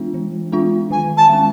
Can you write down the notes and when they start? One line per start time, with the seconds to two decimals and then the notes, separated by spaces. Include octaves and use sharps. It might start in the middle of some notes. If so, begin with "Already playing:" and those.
Already playing: E3 G#3 B3 D4 F4
0.14 E3
0.52 G#3 B3 D4 F4
0.91 D#3 G#5
1.17 A5
1.29 G#3 C#4